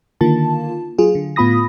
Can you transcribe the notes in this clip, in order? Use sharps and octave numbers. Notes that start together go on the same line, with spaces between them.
D3 D#3 A#3 F4 A5
F#3 F4 G#4
D3
A2 B3 F4 B5 D#6 A#6